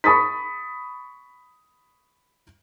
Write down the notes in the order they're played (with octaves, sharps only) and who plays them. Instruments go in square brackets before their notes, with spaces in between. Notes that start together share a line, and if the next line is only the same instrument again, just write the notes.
[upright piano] B5 C#6 D#6 A6 B6